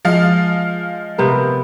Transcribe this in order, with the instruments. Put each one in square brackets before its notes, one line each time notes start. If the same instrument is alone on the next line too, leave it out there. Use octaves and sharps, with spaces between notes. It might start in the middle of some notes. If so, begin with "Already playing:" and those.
[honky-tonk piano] F3 G#3 F5
[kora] C3 B3 A#4